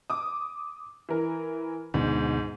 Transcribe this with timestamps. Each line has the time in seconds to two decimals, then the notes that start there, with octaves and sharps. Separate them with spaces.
0.10 D6 D#6
1.09 E3 A#4
1.94 D2 G#2 B2 D3